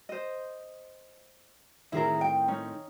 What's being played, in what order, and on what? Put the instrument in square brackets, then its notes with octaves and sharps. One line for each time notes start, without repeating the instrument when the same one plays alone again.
[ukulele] C5 D#5
[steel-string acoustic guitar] A2 D#3 C4 [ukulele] E4 G#4 A#4
[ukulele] G5
C#4 D#4